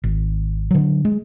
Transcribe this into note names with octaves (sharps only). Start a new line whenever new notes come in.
G#1
D3 F#3
G#3